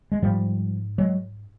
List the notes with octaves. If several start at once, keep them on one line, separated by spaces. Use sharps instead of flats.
G#3
G#2 F3 G3
F#3 G#3